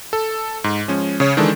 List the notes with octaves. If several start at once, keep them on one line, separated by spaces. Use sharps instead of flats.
A4
G#2
F3 G#3 C#4
C#3 C#5
D#3 E3 G#3 D4 A4